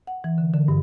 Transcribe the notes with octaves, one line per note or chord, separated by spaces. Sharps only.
F#5
E3
D3
D3
G2